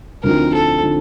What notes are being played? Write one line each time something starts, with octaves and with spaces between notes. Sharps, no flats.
D2 D3 F3 C4 D#4 A#4
A4
D3 F3 C4 D#4